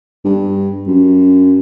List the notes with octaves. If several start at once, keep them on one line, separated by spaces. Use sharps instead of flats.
G2
F#2